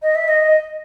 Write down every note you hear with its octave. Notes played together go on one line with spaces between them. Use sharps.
D#5
E5
D#5